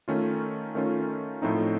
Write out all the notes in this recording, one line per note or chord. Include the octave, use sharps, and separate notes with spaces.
D#3 A3 C#4 F4
D#3 A3 C#4 F4
A2 F3 A3 C4 D#4